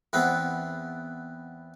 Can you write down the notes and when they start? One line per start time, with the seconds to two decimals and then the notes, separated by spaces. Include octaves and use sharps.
0.13 E2 B3 C4